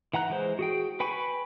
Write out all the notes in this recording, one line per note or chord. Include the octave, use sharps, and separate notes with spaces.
E3 F#5 A#5 F#6
E3 G#3 C5
F#4 G#4 G5
B4 G5 G#5 B5 C#6